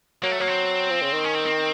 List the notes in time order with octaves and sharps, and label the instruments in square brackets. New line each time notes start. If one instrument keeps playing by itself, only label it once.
[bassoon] F#3 [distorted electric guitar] A#3
[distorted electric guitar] A3
[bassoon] F#3 [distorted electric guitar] A#3
[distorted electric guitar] C4
[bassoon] F3
C#3
D#3
[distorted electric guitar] C#4
C4
C4